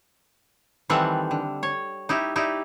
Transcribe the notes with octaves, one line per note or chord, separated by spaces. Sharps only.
D#3 E3 G3 C4 A4 F#5
D3
C#5
D#4 E4 G4
D#4 E4 G4 D5